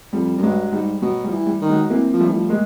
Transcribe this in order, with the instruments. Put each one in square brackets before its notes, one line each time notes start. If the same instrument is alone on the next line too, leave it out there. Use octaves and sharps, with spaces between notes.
[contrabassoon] F2 [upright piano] G3
[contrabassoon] F#2
[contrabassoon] G2 [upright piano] F#3 G#3
[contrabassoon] G#2 [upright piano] G3
[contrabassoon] B2 [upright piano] F#3
[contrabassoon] F3 [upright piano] G3
[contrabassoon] E3
[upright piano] G3
[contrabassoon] D#3
[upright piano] F#3 G#3
[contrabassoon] E3 [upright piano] A#3 C4
[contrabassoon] F3
[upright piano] G3 A3
[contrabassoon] E3
F3
[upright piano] G#3 A#3